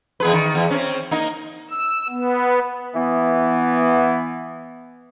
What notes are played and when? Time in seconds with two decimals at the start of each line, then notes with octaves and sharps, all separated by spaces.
0.20 E2 G#4 B4
0.33 D#3
0.55 E2
0.71 C4 C#4
1.11 A#3 D#4
1.70 E6
2.09 B3
2.94 E3 B3